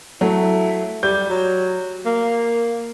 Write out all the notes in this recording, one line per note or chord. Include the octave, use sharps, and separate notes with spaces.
F#3 A3 E4
G3 G6
F#3
A#3